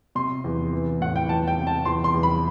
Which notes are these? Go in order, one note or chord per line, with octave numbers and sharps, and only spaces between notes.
C3 C6
E2
E3
A2 F#5
G5
E2 A5
G5
C3
A5
E2 C6
C6
E2
B5